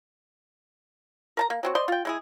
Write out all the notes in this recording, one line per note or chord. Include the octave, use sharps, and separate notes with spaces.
A#4 A5 A#5
A#3
F#3 C4 F#4
C5 D5 D#5 C6
F4 G5
G#3 E4 G#4